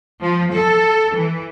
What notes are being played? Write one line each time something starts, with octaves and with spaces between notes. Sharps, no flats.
F3
A4
E3